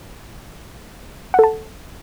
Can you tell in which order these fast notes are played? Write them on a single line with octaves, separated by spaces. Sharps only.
F#5 A4 A5